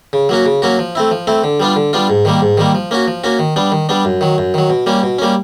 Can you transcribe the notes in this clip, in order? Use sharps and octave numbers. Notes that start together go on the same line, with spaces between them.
C#3
F#3 A#3 C#4 F#4
C#3
F#3 A#3 C#4 F#4
F3
A3 C4 E4
F3
A3 C4 E4
D3
G3 B3 D4 F4
D3
G3 B3 D4 F4
G#2
D#3 G3 A#3
G#2
D#3 G3 A#3
F3
A#3 C#4 F#4
F3
A#3 C#4 F#4
D#3
G3 B3 D4
D#3
G3 B3 D4
F#2
D#3 F#3
F#2
D#3 F#3
B2
G3 A#3 C#4
B2
G3 A#3 C#4